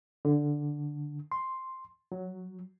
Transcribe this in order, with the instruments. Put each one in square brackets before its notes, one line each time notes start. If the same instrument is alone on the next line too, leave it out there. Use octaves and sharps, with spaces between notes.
[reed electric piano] D3
C6
F#3